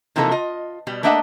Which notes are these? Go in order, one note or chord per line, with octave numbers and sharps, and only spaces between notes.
C3 E3 F3 A#3 D#4 A4
F4 D#5
B2 G3
A3 A#3 D4 D#5 E5 F#5